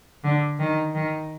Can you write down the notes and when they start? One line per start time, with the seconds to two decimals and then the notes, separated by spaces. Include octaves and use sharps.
0.24 D3
0.59 D#3
0.95 D#3